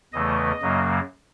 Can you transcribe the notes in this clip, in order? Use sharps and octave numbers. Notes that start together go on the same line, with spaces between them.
E2 C#3 E3 A3 D#5
F#2 C#3 F#3 A#3